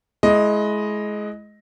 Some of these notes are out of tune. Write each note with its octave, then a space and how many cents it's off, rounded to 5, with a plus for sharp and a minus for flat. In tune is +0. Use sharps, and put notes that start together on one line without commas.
G#3 +25 E4 +0 D#5 +0